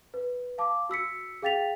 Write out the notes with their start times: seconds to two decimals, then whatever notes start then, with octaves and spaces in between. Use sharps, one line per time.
0.14 B4
0.58 F5 A5 D6
0.89 F#4 E6 B6 C#7
1.42 G#4 F5 G5 A6 B6 F7